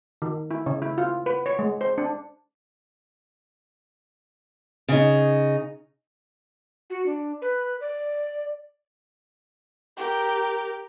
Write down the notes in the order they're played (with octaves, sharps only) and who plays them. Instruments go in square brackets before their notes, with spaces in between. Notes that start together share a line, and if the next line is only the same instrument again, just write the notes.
[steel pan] D#3
E4
C#3
E4
F4
B4
C#5
G#3
C5
D4
[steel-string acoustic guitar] C#3 D#4
[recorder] F#4
D4
B4
D5
[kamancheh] G4 A#4